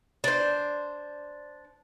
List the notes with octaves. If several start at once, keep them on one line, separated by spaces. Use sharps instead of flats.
D4 C5